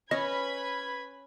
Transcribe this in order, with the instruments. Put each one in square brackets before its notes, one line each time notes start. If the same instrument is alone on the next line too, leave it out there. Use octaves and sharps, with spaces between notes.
[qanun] C#4 C#5 [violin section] B4 B5 G#6 [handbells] D#5